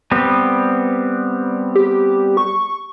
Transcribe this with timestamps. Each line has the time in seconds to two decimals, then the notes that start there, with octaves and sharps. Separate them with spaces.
0.11 G3 B3 C4
1.75 G4
2.37 C#6